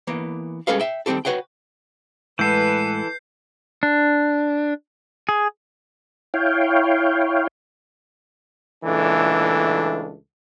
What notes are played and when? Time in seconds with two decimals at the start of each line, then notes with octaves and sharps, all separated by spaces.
0.07 E3 A#3 B3
0.67 G3 G#3 C#4 A4 B4 F5
0.80 E5 G5
1.06 D#3 G3 C4 G4 A4
1.25 F#4 B4 C#5 F#5 G5
2.39 A2 E3 G#3 A4 B4 F#5 G6 C7
3.83 D4
5.29 G#4
6.34 E4 C#5 F5 G5
8.84 C#2 A#2 E3 A3 D4 A4